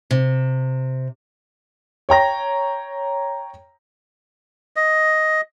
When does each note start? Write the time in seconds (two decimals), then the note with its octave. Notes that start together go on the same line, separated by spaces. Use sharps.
0.11 C3
2.09 C#5 G5 A#5 A#6
4.76 D#5